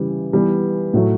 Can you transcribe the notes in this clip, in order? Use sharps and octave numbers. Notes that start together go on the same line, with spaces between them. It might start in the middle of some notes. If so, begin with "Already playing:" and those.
Already playing: C#3 E3 G3
E3 G3 B3
A2 F#3 A3